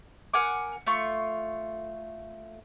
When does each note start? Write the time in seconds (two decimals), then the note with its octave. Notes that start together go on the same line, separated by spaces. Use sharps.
0.33 A#4 F#5 G#5 D6
0.87 A3 F4 C#6